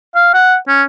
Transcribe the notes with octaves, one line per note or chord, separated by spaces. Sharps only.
F5
F#5
C#4